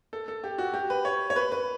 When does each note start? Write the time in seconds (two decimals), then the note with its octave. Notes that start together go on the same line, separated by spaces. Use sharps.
0.13 A4
0.28 A4
0.44 G4
0.58 F#4
0.74 G4
0.90 B4
1.05 C#5
1.30 C#5
1.36 B4
1.52 B4